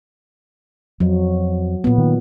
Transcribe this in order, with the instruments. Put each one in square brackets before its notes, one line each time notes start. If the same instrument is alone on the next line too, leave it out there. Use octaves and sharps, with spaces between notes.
[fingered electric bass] F2 [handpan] F#3
[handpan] A#2 B3
[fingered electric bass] D#3